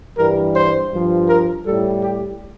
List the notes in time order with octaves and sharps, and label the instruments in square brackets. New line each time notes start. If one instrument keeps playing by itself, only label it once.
[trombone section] G2 E3 G3 A#4
C5
G2 F3
A#4
A2 G3 A4
G4